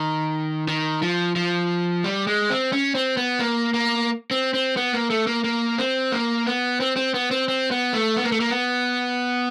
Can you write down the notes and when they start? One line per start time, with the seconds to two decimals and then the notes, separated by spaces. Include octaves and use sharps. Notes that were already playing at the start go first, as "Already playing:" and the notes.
Already playing: D#3
0.68 D#3
1.02 F3
1.36 F3
2.04 G3
2.27 G#3
2.50 C4
2.73 C#4
2.95 C4
3.17 B3
3.40 A#3
3.74 A#3
4.31 C4
4.54 C4
4.77 B3
4.92 A#3
5.10 A3
5.27 A#3
5.44 A#3
5.78 C4
6.12 A#3
6.47 B3
6.80 C4
6.96 C4
7.14 B3
7.31 C4
7.48 C4
7.71 B3
7.93 A3
8.16 B3
8.24 A#3
8.32 A3
8.40 A#3
8.50 B3